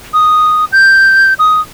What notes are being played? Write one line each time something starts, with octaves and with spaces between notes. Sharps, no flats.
D#6
G6
D#6